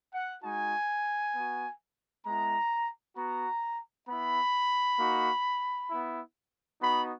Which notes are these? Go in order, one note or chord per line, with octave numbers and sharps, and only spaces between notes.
F#5
G#3 D#4 F#4 G#5
B3 F#4
G#3 B3 E4 A#5
B3 F#4 A#5
B3 E4 B5
A#3 D#4 F#4
B3 E4
B3 D#4 F#4 B5